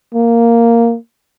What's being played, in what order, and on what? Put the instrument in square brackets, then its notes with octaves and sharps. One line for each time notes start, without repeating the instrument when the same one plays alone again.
[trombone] A#3